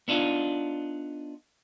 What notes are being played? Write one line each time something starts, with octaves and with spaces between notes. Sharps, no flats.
B3 D4 D#4 F4